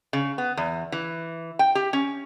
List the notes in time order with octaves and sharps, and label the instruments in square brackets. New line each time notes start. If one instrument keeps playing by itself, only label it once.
[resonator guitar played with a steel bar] C#3
B3
E2
E3
G5
G4
C#4